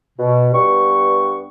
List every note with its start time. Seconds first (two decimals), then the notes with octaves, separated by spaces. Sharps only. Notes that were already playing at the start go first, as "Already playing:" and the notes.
0.19 B2
0.53 G2 B3 C#6